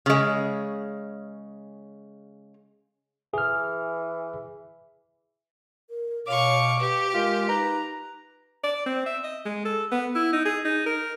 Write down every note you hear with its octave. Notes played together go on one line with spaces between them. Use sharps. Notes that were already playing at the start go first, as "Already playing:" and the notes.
C#3 G#3
E3 G#4 F6
A#4
B2 C#5 F5 C#6 D6
G4 B4
G#3 F4 A#4
D#4 B4 A#5
D5
C4
E5
D#5
G#3
A4
B3
E4
D#4
G#4
D#4
A#4